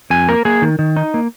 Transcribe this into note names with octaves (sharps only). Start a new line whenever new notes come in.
F2 G#5
A#3 A#4
A#3 G#4
D#3
D#3
D#4
A#3